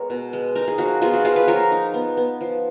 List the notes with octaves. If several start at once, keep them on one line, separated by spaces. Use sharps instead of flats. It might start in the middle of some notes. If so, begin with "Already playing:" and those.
Already playing: G#3 B3 A#4 C#5
B2
G#3
D#4 A#4
G#4
F3 F#4
B3 F4 G#4
F#4
F3 F4 G#4
B4
F3 A#4 C#5
D#4
B3
B3
F3